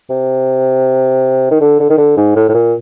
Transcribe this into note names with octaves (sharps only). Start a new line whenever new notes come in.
C3
D#3
D3
D3
D#3
D3
G#2
A2
A2
A#2